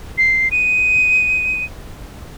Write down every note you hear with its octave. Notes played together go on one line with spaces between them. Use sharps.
C7
D#7